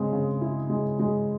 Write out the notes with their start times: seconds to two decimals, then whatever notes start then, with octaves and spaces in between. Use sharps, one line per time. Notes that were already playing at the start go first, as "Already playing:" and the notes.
Already playing: C#3 G#3 C4
0.13 C#3
0.41 E4
0.70 G#3
0.99 G#3